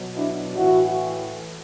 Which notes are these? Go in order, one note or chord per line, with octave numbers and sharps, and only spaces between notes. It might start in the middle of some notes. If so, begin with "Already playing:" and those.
Already playing: B2 F#3
D4 E4
A2 E3 E4 F#4